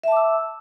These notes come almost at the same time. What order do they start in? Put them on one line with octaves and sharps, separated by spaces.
E5 A5 D6 E6